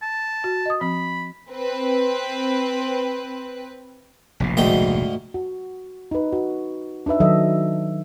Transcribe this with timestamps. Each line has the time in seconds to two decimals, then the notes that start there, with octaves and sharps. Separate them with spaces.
0.02 A5
0.44 F#4
0.66 D#5 D#6
0.81 F3 C4 B5
1.52 C4 B4
4.40 F1 A#1 B2
4.57 D2 G#2 G5
5.34 F#4
6.11 D#4 B4
6.32 F#4
7.06 D4 D#4 B4 E5
7.20 D#3 F#3 A4 D#5 E5